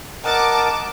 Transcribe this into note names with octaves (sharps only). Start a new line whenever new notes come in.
A#4 D#5 F#5 A5 D6